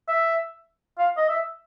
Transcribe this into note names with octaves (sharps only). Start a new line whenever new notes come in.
E5
F5
D#5
E5